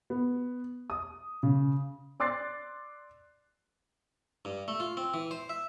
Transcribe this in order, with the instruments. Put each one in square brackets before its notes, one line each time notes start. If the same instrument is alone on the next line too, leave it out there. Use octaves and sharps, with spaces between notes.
[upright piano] B3
D#6
C#3
D5 C6 D6 F#6 A6 C7
[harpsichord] G2
A3
F4
C4
E3
C5
E5